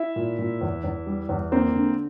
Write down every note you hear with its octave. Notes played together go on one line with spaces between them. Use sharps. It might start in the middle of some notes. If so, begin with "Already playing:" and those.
Already playing: E4 E5
A#2
A#2
E2
E2
G3
E2
A#3 C4 C5
D3